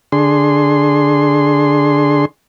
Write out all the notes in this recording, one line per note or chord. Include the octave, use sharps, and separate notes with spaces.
D3 D4 G#4 C6